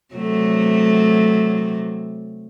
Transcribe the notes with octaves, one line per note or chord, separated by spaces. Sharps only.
C3 F#3 A3